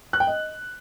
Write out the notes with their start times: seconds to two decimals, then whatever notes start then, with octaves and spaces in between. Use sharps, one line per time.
0.13 F#6
0.20 G5
0.27 D#5